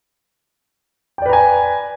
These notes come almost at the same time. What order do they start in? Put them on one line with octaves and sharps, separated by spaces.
G5 D5 B4 A#5 G#5